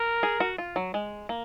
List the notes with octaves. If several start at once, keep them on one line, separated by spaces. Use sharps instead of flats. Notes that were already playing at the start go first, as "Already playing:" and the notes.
Already playing: A#4
G#4
F#4
F4
F#3
G#3
A#3